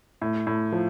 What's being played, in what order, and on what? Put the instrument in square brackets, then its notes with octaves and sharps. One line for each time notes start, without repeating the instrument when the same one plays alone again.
[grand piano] A2
A2
F3